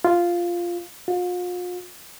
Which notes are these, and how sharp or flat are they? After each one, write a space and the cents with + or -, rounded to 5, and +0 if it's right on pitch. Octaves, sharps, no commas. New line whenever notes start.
F4 -5
F4 +40